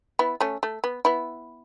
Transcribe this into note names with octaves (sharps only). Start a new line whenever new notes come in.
B3 E4
A3 C#4
A3
B3
B3 E4